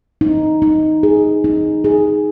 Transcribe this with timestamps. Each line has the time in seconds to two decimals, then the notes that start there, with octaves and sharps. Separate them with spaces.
0.21 D#4
0.62 D#4
1.03 G#4
1.44 D#4
1.84 G#4